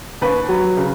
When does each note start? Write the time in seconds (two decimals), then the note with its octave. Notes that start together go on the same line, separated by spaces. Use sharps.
0.21 D#2 B4
0.49 F#3
0.77 C#3